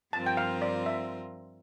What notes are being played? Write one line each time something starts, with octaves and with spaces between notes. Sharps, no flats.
G2 F3 C4 F4 A#4 A5
G5
F5
D5
E5